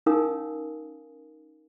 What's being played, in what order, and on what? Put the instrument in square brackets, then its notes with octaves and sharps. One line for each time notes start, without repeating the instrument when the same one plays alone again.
[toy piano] C#4 D#4 A#4 F5 G#5 D#6